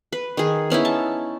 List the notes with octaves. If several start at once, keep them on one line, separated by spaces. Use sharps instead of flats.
B4
D#3 G#4
B3 C#4 D#4 E4
A5